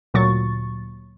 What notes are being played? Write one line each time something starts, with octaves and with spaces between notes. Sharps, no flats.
D2 A#2 F#3 C#6 A6